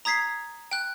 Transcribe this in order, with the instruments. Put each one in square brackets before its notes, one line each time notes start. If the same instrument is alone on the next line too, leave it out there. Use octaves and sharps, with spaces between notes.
[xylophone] A#5 D#6 G#6 B6 C7
G5 F#6